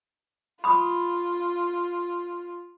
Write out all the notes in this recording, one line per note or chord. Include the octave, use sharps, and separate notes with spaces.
F4 B5 D#6